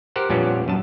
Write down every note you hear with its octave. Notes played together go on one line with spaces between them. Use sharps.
G4 A#4 C5 F#5
F2 A#2 G3 B3 C#4 D4
F#2 A5